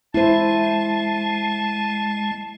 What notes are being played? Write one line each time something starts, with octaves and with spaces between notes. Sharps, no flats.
G#3 E4 C5 A5